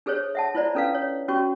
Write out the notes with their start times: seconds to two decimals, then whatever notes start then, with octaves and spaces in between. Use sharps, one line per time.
0.06 D4 G#4 A4 C5 C#5
0.35 E5 F#5 A5
0.55 E4 F4 C5 D5 A#5
0.75 C#4 D4 A4 B4 F5
0.94 C#5
1.28 C#4 F#4 C#6